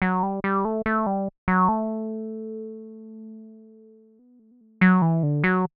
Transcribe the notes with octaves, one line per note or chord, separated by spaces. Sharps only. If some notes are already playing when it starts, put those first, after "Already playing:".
F#3
G3
G3
A3
A3
G3
F#3
A3
B3
A3
B3
A3
F#3
E3
D3
F#3